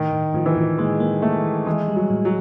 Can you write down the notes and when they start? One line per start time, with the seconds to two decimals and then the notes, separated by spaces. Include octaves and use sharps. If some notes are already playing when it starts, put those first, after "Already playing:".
Already playing: A2 D#3
0.12 A2
0.34 A2 F3
0.46 E3
0.56 A2 F3
0.78 G#3 A#3
1.00 A#3
1.22 A3 A#3
1.44 E3
1.66 E3 G#3
1.88 G3
1.96 F#3
2.10 A2
2.25 F#3